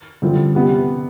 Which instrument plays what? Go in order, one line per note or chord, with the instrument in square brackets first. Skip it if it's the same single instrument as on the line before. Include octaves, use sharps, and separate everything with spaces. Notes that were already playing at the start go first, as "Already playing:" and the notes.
[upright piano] G2 D3 F3 C4 E4
C3 G3 B3